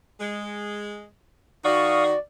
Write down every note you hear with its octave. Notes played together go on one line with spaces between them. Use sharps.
G#3
D#3 F#4 D5 F5 C#6 D#6